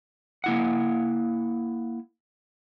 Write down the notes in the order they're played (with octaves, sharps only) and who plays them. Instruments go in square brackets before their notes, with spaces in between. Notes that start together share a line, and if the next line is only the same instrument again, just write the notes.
[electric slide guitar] A#3 E4 F#5